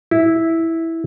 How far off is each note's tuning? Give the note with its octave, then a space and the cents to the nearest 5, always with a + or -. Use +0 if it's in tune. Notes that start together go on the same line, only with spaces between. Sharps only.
E4 -5